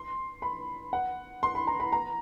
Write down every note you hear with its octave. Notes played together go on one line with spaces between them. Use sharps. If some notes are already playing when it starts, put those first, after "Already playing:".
Already playing: C6
B5
F#5
C6
B5
A#5
B5
A#5